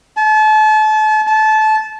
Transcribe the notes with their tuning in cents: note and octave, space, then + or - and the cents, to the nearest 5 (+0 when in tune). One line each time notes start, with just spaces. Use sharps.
A5 -35
A5 -20